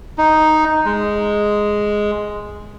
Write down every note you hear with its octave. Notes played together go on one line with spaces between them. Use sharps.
D#4
G#3